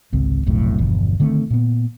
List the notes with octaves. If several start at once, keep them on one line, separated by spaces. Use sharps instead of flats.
G#1 C#2 C3 C4
F1 B1 F2 A2
G1 E2 B2 F3
D3 D#3 A3 C4
A#2 B3